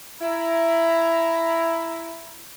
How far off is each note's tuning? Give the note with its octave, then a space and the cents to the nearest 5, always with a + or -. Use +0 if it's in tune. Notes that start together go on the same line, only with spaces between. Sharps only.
E4 +10 A#5 +5